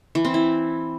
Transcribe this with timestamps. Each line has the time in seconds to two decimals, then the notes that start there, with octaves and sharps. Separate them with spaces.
0.15 E3
0.25 C4
0.34 E4